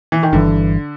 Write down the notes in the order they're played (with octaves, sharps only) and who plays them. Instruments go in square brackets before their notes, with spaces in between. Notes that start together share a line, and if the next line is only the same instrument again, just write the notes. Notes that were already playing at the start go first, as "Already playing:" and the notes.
[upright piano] E3
D#3
[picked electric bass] G1 G2 E3 [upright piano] D3